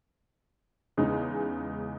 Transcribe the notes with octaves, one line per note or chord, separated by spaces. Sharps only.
E2 C#3 G#3 D#4